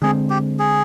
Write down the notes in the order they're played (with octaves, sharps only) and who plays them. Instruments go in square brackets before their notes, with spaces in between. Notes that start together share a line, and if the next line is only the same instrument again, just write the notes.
[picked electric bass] D3 G#3 C4 [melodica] G#4
[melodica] G4
G#4